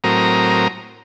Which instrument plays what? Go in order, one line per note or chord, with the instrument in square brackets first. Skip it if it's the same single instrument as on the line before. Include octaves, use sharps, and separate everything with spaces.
[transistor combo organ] A2 F#3 C4 A#4 A#5 D#6